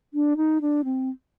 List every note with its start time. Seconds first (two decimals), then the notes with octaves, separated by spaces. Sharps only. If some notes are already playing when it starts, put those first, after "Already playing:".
0.14 D4
0.37 D#4
0.61 D4
0.84 C4